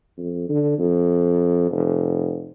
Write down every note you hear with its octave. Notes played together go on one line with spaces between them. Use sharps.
F2
D3
F2
F1